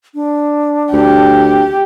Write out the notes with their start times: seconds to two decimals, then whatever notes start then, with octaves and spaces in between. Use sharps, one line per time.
0.14 D4
0.93 D2 G4